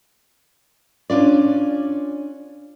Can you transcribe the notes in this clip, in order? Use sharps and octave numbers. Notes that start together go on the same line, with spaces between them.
C#4 D4 F4 D5